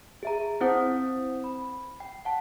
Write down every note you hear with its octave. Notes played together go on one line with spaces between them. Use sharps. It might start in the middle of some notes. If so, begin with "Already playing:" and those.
G#4 E5 A#5
C4 E4 C5 F#5 D#6 G6
B5
G5
F#5 A5